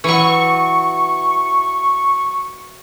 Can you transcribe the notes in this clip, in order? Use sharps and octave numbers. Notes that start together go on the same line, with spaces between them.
E3 F#3 C#6